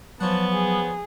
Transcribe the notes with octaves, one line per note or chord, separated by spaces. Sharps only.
F3 F#3 B3 C#4 F#5 A5
G#4